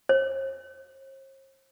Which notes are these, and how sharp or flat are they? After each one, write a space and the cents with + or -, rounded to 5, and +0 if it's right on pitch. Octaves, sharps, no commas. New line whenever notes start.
C5 +45